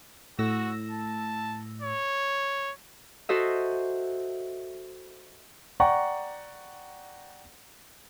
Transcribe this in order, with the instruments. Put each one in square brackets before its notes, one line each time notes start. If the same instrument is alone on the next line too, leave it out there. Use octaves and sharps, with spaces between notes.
[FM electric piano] A2 E6 A#6 [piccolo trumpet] F#4
[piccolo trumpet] A5
C#5
[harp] F#4 A4 C5 D#5 E5
[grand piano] D5 F#5 G5 A#5 C#6